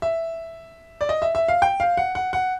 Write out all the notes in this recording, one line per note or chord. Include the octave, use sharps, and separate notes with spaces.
E5
D5
D#5
E5
E5
F5
G5
F5
F#5
F#5
F#5